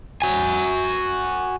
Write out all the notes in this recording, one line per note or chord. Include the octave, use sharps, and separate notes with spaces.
F#4 G#5